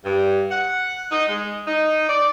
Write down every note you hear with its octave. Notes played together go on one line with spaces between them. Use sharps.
G2
F#5
D#4
G#3
D#4
D5